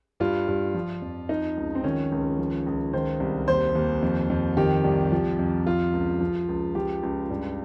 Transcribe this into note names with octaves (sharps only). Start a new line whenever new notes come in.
G2 F4
G2
F3
F2
F3 D#4
C#2
C4
D#3 C#4
C#2
F3
C#2
D#3 C5
C2
D#2 C5
D#2
F2
F2
D#3 G4
C2
F3
F2
F3 F4
C#2
F3
C#2
F3 G4
C#2
G2